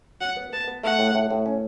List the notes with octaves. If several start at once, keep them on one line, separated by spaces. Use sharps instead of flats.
F#3 F#5
B3
B3 A5
B3
A3 F#5
A2
A2
A2
C#4